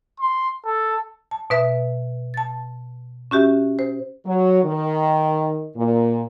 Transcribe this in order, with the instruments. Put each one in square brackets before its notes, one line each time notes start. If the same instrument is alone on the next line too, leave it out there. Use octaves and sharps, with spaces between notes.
[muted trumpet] C6
A4
[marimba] A5
B2 B4 E5
A5 A6
C#4 F#4 G4 E5
C5
[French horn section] F#3
D#3
A#2